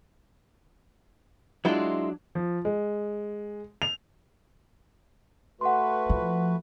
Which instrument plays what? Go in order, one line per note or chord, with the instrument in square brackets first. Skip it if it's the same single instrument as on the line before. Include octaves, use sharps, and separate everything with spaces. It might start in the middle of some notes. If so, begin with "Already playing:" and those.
[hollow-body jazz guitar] F#3 D4 [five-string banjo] G#3 E4 F4
[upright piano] F3
G#3
F7
[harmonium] A3 F#4 B4 [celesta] F#5 C6
[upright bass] F3